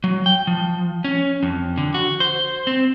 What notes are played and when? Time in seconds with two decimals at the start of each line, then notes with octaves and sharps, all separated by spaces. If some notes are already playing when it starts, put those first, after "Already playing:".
0.04 F#3
0.26 G5
0.47 F3
1.04 C#4
1.43 F2
1.78 D3
1.94 F#4
2.20 C5
2.67 C4